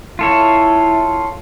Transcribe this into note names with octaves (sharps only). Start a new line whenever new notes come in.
E4 F4 A4 C#5